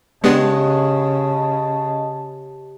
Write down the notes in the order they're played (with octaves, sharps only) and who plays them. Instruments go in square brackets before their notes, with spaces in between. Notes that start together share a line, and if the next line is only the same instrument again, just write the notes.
[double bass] C#3 [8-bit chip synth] G#3 B3 D4 [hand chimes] G4 [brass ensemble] D#5 A5